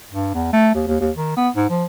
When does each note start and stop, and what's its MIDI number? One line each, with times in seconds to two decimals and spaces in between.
0.12 0.34 43
0.34 0.51 40
0.53 0.72 57
0.75 0.85 39
0.87 0.97 39
1.01 1.10 39
1.16 1.33 51
1.37 1.49 59
1.56 1.68 44
1.70 1.85 53